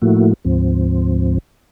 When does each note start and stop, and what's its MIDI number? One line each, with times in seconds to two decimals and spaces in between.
0.02 0.33 45
0.02 0.33 53
0.02 0.33 57
0.02 0.33 58
0.02 0.33 64
0.02 0.33 66
0.45 1.38 38
0.45 1.38 44
0.45 1.38 53
0.45 1.38 60